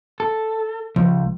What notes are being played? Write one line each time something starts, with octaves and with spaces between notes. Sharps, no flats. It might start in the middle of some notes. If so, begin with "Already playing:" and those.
A4
C#2 F3